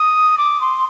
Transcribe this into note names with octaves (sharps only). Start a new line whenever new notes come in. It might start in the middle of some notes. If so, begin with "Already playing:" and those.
Already playing: D#6
D6
C6